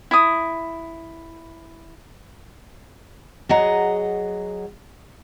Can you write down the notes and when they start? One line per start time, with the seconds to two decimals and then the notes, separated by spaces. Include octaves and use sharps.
0.11 E4 D#6
3.49 F#3 G#4 D#5 F#5 A#5